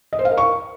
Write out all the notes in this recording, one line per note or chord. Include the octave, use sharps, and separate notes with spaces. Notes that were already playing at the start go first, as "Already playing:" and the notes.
D#5
C5
F5
A#4
C#6